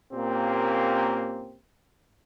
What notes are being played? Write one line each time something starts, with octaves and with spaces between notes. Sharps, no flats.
A#2 A#3 C4 C#4 G4